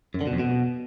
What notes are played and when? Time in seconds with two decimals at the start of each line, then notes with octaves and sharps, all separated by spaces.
0.14 F#2
0.21 D3
0.27 B2
0.33 F2
0.39 B2